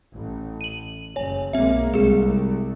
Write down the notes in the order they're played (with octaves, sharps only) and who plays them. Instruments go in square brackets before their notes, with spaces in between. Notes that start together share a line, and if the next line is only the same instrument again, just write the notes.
[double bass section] A1
[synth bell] D#7 F#7
[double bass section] F#1 [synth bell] C#5 G#5
[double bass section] B1 G#3 A#3 [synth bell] C4 E5
[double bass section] C2 [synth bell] G#3 G#4